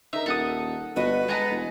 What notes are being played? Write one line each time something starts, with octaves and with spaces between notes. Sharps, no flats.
D#4 A#4 E5
D#1 A4 F#5 D#6
G1 B3 F#4 B4 D#5
G#3 A4 F#5 G#5 A#5
E1